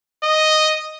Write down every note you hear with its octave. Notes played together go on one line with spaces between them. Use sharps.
D#5